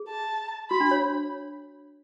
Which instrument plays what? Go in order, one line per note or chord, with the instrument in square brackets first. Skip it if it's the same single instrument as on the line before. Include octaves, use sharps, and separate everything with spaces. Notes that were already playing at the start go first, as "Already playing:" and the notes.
Already playing: [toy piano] G#4
[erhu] A5
[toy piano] F#4 [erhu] B5
[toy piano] D4
C#5